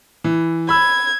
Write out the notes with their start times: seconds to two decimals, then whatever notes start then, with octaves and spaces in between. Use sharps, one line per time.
0.24 E3
0.69 B5 E6 G#6